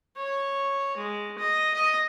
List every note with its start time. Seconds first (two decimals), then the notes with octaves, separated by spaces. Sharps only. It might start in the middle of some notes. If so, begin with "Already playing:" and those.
0.16 C#5
0.97 G#3
1.38 D#5
1.74 D#5